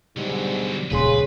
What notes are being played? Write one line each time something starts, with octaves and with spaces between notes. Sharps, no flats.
G#2 B2 D3 F#3 G3
D#1 C#2 C#3 G#4 B4 C6